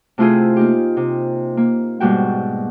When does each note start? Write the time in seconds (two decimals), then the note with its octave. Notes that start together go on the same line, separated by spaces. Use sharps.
0.18 C3 A3 E4 F4 G4 G#4
0.56 A#3 D#4 G4
0.97 C3
1.57 A#3
2.00 G#2 B2 G3 A#3 F#4 G5